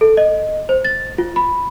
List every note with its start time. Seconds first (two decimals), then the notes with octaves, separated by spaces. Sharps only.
0.01 A4
0.17 D#5
0.69 C5
0.84 A6
1.18 F4
1.36 B5